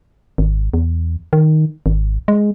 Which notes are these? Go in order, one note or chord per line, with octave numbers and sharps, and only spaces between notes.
G#1
E2
D#3
G#1
G#3